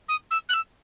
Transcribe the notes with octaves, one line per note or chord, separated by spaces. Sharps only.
D#6
E6
F#6
E6